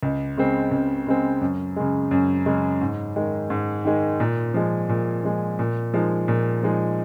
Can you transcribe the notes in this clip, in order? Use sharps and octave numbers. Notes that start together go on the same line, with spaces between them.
C#2
C#3 G#3 C4
C#2
C#3 G#3 C4
F#2
C#3 G#3
F#2
C#3 G#3
G#2
D#3 G#3
G#2
D#3 G#3
A#2
F3 G#3
A#2
F3 G#3
A#2
F3 G#3 D#4
A#2
F3 G#3 D#4